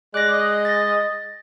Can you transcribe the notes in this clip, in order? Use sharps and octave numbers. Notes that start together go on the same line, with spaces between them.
G#3 D5 F#6 A#6
D#5
A6 A#6